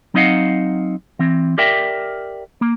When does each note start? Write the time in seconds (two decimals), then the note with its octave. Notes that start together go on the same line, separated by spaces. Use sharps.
0.14 F#3 C4 D#4 D#5 F5 F#5
1.19 E3 C4
1.58 G4 A#4 D5 E5 G5
2.61 A#3